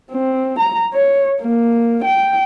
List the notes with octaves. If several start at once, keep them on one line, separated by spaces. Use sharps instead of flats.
C4
A#5
C#5
A#3
G5